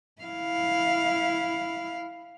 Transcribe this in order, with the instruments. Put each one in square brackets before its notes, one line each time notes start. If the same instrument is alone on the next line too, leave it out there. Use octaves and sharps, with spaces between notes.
[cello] E4 F5